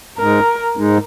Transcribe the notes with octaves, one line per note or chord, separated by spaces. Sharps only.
G#2 G#3 D#4 A#4
G#2 G#3 D#4